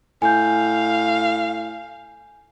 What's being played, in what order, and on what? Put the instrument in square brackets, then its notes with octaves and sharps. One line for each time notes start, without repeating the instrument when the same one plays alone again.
[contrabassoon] A2 [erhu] F5 [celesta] G#5 G6